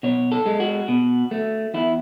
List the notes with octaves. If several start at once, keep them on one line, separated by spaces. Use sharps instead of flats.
B2 C#5
A4
G#3
F#4
B2
A3
E2 E4